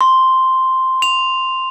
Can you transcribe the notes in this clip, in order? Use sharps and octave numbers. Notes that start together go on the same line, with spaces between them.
C6
F7